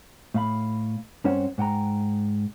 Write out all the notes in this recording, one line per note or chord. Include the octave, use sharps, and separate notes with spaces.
A2 F5 B5
G2 C4 C#4 C5 C#5 F#5
G#2 F#5 G5 A#5